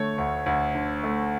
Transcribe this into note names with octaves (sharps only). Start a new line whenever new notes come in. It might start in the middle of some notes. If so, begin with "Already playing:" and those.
Already playing: D3 A3 C#5
D2
D2
D3
A3